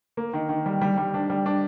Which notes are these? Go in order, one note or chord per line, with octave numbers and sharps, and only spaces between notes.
A#3
D#3
D#3
G3
G3
G3
D4
G3
D4